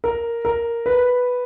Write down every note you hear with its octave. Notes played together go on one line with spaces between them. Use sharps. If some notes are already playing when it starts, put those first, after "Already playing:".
A#4
A#4
B4